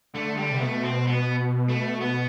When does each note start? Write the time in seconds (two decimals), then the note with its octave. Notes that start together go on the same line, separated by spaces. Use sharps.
0.14 D3 A3
0.37 G3
0.51 C3 B3
0.61 B2 A3
0.84 C4
1.07 B3
1.69 A3
2.00 B3